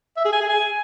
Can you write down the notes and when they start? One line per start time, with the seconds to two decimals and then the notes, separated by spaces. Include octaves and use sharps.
0.17 E5
0.25 G#4
0.33 G#5
0.41 G#4
0.49 G#5